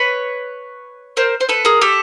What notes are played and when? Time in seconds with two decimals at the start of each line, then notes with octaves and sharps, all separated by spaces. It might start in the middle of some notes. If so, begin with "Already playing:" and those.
Already playing: B4 C#5
1.17 A#4 C5
1.41 C5
1.49 A4 B4
1.65 G#4 A#4
1.81 G4 A4